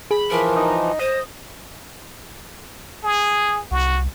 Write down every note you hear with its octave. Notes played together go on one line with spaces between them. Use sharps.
G#4 B5
E3 F3 A#4
D#4
C5 D#5
G#4
C2 F#4